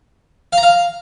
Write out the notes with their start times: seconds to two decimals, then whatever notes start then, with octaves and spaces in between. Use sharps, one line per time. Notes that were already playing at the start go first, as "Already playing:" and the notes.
0.53 F5
0.58 A#5
0.63 F5